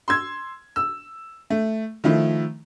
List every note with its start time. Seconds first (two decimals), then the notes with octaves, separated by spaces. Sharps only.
0.08 C6 E6 G#6
0.76 E6
1.50 A3
2.04 D#3 F3 A3 E4